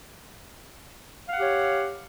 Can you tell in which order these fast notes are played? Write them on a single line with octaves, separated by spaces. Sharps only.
F5 F#5 G4 C#5